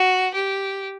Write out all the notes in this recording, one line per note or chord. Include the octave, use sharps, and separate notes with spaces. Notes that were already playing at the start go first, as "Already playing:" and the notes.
Already playing: F#4
G4